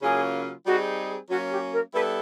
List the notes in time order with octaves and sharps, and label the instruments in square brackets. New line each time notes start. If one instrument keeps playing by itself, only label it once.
[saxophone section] C#3 F#3 A#3 C#4 F4 [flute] G#4
[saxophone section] G3 C4 D#4 G#4 [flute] F#4
[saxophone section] F#3 A#3 C#4 [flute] F#4
[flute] G4
A#4
[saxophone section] G3 B3 E4 A4 [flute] B4